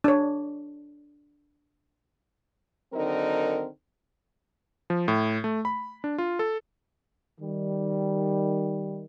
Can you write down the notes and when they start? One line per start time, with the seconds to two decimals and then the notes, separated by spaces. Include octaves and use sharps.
0.04 D4 C#5
2.93 D3 D#3 F#3 C4 D#4 A#4
4.90 F3
5.08 A2
5.44 A3
5.65 B5
6.04 D4
6.18 F4
6.39 A4
7.41 D#3 G3